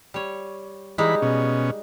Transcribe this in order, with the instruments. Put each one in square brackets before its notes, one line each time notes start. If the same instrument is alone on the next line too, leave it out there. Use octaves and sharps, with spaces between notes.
[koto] G3 C#5
[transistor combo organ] E3 B5 [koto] G3 G#3 D#4
[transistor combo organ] B2 C#4